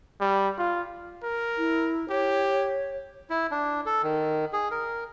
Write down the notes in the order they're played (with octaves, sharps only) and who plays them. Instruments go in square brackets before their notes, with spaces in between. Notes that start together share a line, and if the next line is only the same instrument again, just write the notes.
[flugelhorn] G3
F4
[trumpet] A#4
[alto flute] E4
[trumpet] G4 [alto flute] C#5
[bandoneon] E4
D4
A4
D#3
G#4
A#4